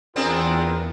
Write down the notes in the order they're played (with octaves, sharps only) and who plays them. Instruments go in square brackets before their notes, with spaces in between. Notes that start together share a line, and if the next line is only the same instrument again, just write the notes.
[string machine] E2 [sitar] B3 C4 D4 [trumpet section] F4 G#4 A#4